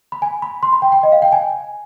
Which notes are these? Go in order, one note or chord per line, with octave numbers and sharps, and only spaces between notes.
B5
G#5
B5
C6
B5
G5
G5
D#5
F5
G5
G#5